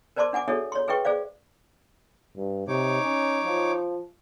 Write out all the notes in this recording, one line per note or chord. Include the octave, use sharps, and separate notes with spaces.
A#4 C5 D5 A5 C6 D6
D4 F#5 G#5 D6
D4 F#4 G#4 A4 C#5 E5
C#5 C6
G#4 B4 E5 G5 C#6
G#4 C5 D5 F5
G2
C3 D#4 C#5 D6
C#4
F3